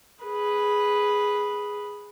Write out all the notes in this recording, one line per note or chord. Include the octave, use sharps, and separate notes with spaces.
G#4 B4